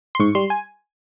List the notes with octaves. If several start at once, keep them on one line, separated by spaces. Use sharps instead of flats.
C6
G#2 C#6
G3 C6
G#5